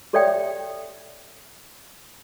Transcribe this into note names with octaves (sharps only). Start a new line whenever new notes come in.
G4 A4 C#5 D5 E5 G5